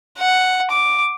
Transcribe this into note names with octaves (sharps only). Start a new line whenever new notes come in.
F#5
D6